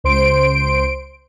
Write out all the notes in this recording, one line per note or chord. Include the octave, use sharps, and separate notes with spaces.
C#2 C5 C6 D7